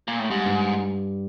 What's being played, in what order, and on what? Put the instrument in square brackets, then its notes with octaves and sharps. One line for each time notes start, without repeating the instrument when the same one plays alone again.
[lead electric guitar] A#2
A2
[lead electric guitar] G#2 [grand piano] G3
[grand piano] G2